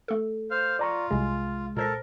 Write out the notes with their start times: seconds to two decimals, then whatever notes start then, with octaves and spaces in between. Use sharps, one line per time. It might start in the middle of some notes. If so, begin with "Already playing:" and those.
0.08 A3 A4
0.51 C5 F5 F6
0.79 F4 D5 A#5 C#6
1.11 C2 C3 G#3
1.77 A#2 A4 A#4 C5 A#6